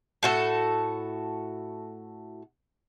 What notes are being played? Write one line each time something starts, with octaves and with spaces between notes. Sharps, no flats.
A2 F#4 A4